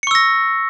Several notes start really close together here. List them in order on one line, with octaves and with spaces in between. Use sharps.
C#7 C#6 E6 A#6